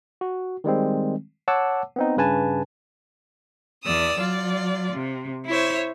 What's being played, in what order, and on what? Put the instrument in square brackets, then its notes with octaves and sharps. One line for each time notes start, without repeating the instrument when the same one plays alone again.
[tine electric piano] F#4
D#3 G3 G#3 C4
C#5 F#5 A5 D6 E6
B3 C4 D#4
G2 C#3 B4 G#5 A5
[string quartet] E2 D5 D#6 E6
F#3 F4 D5
C3
E4 C5 C#5 E5